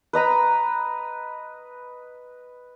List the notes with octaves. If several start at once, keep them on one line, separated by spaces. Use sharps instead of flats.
B4 D#5 A#5 B5